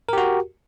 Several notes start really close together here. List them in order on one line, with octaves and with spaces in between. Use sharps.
A#4 G4 F#4